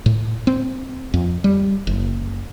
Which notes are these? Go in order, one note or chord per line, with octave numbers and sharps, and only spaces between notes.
A2
C4
F2
G3
F#1